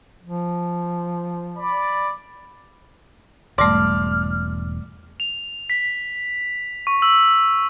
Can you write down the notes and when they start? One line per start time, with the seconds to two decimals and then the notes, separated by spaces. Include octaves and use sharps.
0.23 F3
1.57 D5 B5
3.58 E1 G#2 G3 A3 D5 F6
5.20 F7
5.70 B6
6.87 C#6
7.02 E6